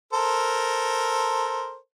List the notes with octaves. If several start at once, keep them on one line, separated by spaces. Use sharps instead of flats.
A4 A#4 C5